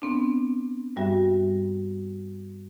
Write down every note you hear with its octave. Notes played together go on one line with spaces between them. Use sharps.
B3 C4 D4
G2 G3 F#4 E5